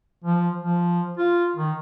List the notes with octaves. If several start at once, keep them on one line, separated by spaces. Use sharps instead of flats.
F3
F3
F4
D#3